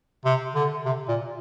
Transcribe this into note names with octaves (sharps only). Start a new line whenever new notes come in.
C3
D3
C3
A#2